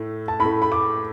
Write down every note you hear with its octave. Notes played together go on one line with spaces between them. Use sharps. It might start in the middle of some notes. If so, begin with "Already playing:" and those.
Already playing: A2 A3
A5
A2 B5
A3
B5
D6